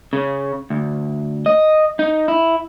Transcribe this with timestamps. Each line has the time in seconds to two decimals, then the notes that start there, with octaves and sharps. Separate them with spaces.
0.13 C#3
0.70 D2
1.46 D#5
1.99 D#4
2.28 E4